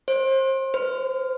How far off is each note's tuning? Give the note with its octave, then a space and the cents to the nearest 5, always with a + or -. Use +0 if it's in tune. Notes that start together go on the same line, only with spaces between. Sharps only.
C5 +30
C5 -35